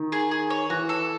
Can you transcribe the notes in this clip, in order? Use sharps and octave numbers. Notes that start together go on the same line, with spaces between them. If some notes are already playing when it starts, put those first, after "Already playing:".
Already playing: D#3
G#4
G#4
C#5
E3 F#4
A4